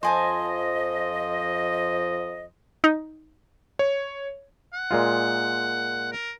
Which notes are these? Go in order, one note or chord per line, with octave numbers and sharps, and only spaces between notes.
F2 F3 C5 D#5 G#5 A5
D#4
C#5
F#5
A#2 G#3 F4
A#4